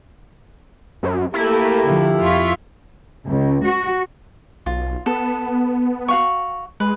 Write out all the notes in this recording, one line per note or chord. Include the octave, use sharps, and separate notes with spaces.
F#2
A3 A#3 E4 G4
D3 F3
F2 F4 C#6 B6
C#2
F#4
B1 F4
B3 A4
F#4 F5 C#6
G#3 B4